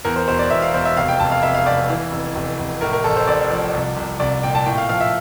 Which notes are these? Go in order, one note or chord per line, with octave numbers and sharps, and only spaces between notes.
E2 A#4
C5
E1 C5
D5
E2 E5
F5
E1 C5
E5
F1 F5
G5
F1 A5
F5
F1 E5
F5
F1 D5
E3
F1
F1
F1
A2 A#4
A#4
A1 A4
C5
A1 D5
F3
C2
C2
C2 D5
A#2 G5
A5
A2 G5
F5
F3 F5
E5